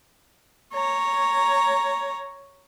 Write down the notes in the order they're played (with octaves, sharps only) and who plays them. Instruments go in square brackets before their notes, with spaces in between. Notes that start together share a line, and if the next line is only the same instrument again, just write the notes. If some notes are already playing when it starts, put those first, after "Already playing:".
[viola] C#5 A#5